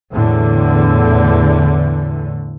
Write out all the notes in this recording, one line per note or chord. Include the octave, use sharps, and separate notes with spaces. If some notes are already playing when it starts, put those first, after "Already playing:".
E2 A2 D3